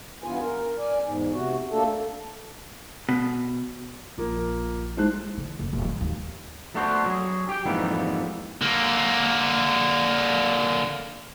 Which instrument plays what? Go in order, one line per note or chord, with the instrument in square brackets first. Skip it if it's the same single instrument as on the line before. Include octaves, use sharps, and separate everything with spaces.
[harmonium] G2 E3 B3 F4 G#5
A#4
D5 G#5
E2 G#2
C3 F#4
A3 A#3 D4 A4
[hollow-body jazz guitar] B2
[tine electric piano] A#1 [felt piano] F3 A#3
[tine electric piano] G#3 D#4 E4 [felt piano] C5 A5 F#6
[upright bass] D3
F#1
D#1
D#3
D#2
[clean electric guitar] A3 B3 D4 F#4 C5
F#3 G#4
G4 G5
F2 G#2 E3 G3 A#3 B3
[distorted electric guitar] D3 A#3